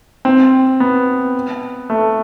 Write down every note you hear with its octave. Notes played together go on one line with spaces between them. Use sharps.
C4
B3
A3